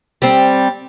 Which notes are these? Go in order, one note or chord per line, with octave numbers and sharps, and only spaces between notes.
G3 C4